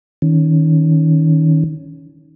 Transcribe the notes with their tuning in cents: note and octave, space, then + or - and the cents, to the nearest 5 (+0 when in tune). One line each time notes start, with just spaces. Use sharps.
D#3 +25 C#4 +10